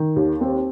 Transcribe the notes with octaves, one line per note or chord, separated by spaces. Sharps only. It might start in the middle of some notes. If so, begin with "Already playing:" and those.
Already playing: D#3
D#2
C4